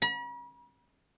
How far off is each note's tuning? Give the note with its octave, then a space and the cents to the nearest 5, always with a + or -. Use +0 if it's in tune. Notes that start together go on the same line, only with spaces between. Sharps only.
B5 -45